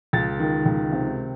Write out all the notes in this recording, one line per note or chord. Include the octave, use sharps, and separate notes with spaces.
C#2 A6
D#3
C#2
C3